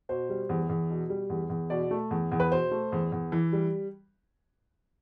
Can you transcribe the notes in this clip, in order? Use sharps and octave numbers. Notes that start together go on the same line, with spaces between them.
B2 C5
G3
E2
E2
B2
G3
E2
E2
B2 D5
A3
E2
E2
B4
B2 C5
A3
E2
E2
E3
G3